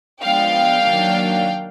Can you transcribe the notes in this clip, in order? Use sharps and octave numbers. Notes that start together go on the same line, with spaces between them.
F3 G#3 B3 D4 F5 G5
D#3 F#3 A#3 D4